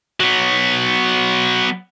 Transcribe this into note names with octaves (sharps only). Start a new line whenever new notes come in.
F#3 B3